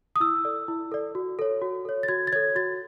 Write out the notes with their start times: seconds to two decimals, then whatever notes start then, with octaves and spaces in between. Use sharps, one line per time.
0.16 D#6
0.20 E4 E6
0.45 A4 D5
0.68 E4
0.92 A4 D5
1.15 F#4
1.39 A4 C#5
1.62 F#4
1.85 A4 C#5
2.03 A6
2.08 F#4 G#6
2.27 A6
2.32 A4 C#5 G#6
2.56 F#4 A6